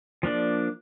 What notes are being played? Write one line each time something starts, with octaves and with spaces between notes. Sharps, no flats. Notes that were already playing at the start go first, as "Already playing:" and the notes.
F3 A#3 D4 D5